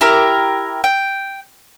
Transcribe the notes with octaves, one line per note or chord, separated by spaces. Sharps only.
E4 G4 A#4 A#5
G5